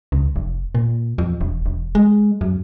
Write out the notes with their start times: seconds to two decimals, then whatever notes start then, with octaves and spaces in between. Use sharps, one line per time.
0.12 C#2
0.36 F1
0.75 A#2
1.18 F2
1.41 E1
1.66 E1
1.95 G#3
2.41 F#2